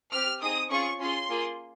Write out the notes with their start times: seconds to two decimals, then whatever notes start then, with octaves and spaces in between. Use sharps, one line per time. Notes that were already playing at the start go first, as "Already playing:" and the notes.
0.11 C4 G4 F6
0.41 C4 D#4 G#4 D#6
0.70 C#4 F4 G#4 C#6
1.00 C#4 F4 G#4 C6
1.29 A#3 F4 G#4